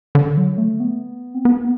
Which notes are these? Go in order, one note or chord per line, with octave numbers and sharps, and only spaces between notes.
D3
F#3
A3
B3
C4
B3